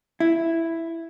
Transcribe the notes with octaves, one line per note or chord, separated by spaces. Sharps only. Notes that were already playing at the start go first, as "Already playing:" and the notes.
E4